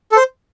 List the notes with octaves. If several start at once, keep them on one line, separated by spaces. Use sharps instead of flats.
A4
C5